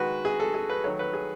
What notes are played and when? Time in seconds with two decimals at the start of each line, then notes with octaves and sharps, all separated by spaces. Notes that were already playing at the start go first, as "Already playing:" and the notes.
Already playing: D#3 G#3 F#4 B4
0.25 G#4
0.40 A4
0.54 G#4
0.70 B4
0.84 D#3 F#3 A3 C#5
0.99 B4
1.13 G#4